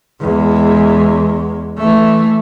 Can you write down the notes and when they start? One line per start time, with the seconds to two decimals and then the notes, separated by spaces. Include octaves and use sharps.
0.21 E2 G#3
1.78 E3 A3